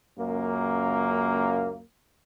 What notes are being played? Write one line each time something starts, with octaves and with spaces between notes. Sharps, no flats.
C#2 F#2 A#3